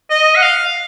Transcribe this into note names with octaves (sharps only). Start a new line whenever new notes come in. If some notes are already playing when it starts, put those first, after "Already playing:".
D#5
F#5
F5